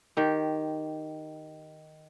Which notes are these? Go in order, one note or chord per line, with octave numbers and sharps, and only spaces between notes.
D#3 G4